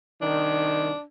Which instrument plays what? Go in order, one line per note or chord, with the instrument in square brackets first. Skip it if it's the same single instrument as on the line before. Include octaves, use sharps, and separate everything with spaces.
[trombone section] C2 D#3 [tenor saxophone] D4